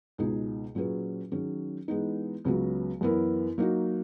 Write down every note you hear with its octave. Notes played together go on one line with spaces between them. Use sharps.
C#2 B2 G#3 D#4 G#4
A#2 F#3 C#4 G#4 B4
D#3 F#3 C#4 G#4
E3 G#3 B3 D#4
C#2 C#3 F#3 B3 F#4
F#2 E3 B3 E4 A#4
F#3 A#3 D#4 F#4